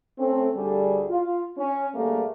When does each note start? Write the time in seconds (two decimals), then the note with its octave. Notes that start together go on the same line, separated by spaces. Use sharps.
0.18 A3 C4 C#4
0.55 D2 G3 G#4
1.09 F4
1.58 C#4
1.95 D2 G3 A3 A#3 G#4 A#4